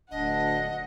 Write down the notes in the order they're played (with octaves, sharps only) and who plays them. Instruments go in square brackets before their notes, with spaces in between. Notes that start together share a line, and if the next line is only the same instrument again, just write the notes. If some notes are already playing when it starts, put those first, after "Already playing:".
[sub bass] D1 [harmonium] D2 D4 [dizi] D#5 [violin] F#5